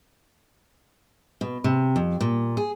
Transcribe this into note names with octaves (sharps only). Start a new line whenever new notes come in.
B2
C3
F2
A#2
G#4